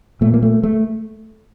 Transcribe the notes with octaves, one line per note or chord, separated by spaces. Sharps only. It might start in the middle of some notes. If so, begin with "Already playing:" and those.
A#2 A3
A#3
A3
A3